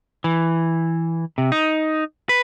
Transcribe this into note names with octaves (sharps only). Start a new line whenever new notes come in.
E3
C3
D#4
B4